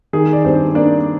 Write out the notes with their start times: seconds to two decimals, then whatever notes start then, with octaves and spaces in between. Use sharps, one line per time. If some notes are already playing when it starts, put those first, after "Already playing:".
0.13 D#3 G#4
0.33 D5
0.45 G2 C4 C5
0.75 A#3 D4 D5